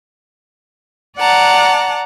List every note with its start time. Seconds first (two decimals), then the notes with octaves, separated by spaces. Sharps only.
1.19 D5 F#5 A5 A#5